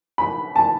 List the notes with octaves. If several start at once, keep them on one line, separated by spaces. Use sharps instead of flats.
B5
A5